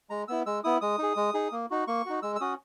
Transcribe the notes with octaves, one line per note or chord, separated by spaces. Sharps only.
G#3 A#5
B3 E4 E6
G#3 E6
B3 E4 D#6
G#3 D#6
D#4 G#4
G#3
D#4 G#4
A#3
D#4 F#4
A#3 C#6
D#4 F#4
G#3 E6
E6
C#4 F#4 D#6